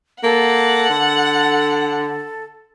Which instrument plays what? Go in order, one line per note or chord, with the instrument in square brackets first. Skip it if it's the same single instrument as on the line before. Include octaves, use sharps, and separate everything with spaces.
[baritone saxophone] A#3 [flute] A4 [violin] F#5
[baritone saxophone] D3